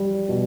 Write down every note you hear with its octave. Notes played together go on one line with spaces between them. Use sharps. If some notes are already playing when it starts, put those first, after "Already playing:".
Already playing: G3
B2